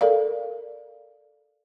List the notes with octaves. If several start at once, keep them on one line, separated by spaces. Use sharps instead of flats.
A4 A#4 D5 F5